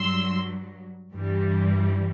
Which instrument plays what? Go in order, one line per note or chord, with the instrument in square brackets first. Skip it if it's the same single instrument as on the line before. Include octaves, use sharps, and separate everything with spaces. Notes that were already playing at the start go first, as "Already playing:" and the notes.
Already playing: [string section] G2 F#3 C6 E6
G2 E3 G3